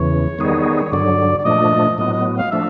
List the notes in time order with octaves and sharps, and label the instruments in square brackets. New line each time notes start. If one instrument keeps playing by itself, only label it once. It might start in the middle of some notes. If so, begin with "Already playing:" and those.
Already playing: [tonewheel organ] E2 C#3 E3 [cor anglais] C#5
[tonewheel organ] D#3 G3 B3 D#4 G#4
[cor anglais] C#5
[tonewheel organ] G2 D3 F#3 [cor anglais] D5
[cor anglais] D5
[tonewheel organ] A#2 F3 A3 D4 [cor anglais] D#5
[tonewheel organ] A2 F#3 B3 [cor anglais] D#5
[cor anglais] D#5
F5
[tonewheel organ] F3 A3 D4 [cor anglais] E5